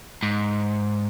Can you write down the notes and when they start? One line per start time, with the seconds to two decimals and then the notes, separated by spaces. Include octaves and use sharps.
0.23 G#2